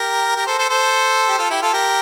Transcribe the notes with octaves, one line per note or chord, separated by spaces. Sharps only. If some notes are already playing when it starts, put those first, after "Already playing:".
Already playing: G4 A#4
G4 A#4
A4 C5
A4 C5
A4 C5
G4
F4 A4
E4 G4
F4 A4
G4 A#4